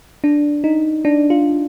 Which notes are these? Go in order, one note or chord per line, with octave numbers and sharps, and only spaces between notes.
D4
D#4
D4
F4